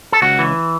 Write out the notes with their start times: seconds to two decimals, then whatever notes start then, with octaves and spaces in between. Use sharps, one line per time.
0.12 A4
0.22 C#2 F#4
0.39 E3